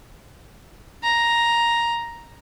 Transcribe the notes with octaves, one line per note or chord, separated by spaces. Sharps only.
A#5